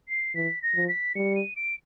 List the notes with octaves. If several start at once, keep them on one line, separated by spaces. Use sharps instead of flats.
C7
E3 B6
A#6
F3
B6
G3 C#7
D#7
D7